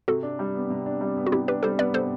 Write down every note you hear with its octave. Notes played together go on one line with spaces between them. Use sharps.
C3 F#4 A4
D4
G3
B3
C3
D4
G3
B3
F#4
C3 E4 G4
D4 G4 B4
G3 A4 C5
B3 B4 D5
C3 A4 C5